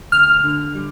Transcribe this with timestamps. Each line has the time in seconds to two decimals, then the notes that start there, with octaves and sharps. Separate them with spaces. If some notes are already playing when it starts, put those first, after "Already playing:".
0.12 D2 F6
0.44 D3
0.75 G3